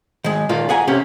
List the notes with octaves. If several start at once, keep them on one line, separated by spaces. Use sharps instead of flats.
D#3 G#3
A#2 D#3 A#3 F4
G#4 F#5 G#5 A#5
C3 A#3 C#4 G4